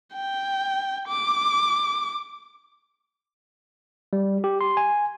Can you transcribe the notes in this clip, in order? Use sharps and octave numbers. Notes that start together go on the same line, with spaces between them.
G5
D6
G3
G4
C6
G#5